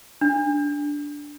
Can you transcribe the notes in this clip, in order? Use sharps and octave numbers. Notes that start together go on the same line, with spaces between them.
D4